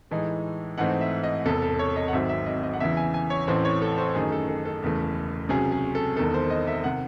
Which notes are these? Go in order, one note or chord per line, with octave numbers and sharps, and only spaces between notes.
A2 E3 G#3 D#4
G#2 E3 A3 C4 D#4 F#5
E5
D#5
E1 E2 C3 A4
A4
C#5
D#5
F#5
G#1 G#2 F#3 C4 E5
E5
D#5
D#5
F#5
E2 C#3 E3 E5
G#5
G#5
C#5
A1 A2 E3 C4 C5
C#5
A4
C5
F#2 D#3 A3 D#4 G#4
A4
A4
A4
E1 E2 C#3 E3 A3
C#2 C3 F#3 C#4 G#4
G#4
A4
E1 E2 D#3 A4
C5
D#5
E5
C3 D#3 F#5